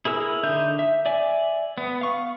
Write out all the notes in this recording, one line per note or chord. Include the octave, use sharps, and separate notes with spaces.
E4 G#4 A#4 E6
D3 D#4 E5 G6
E5
D5 E5 G#5
B3
F5 C#6